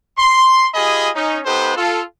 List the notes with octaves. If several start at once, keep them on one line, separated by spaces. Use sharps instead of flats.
C6
F4 G4 G#4 D#5 G#5 B5
C#4 D#4
B3 D#4 G4 A4 B4 C5
F4 A4